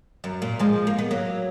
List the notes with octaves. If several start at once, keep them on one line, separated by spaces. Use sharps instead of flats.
F#2
A#2
F3 G#3
A#3
B3
F#3 A#3